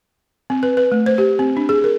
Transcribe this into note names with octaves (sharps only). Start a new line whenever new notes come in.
C4
B4
B4
A3
C5
G4
C4
D4
G#4
A#4